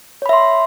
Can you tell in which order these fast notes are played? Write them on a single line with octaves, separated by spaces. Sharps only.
C#5 B5 E5 C6